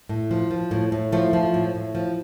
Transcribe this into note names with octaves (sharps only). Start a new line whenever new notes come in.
A2
F3
F3
A2
A2
F3 A3
F3
A2
A2
F3